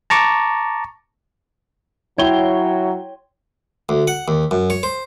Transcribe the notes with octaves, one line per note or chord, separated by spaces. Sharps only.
A5 A#5 C#6 D6
F#3 E4 C#5 G5 C6 G7
D2
F#5
D#2
F#2
C#5
C5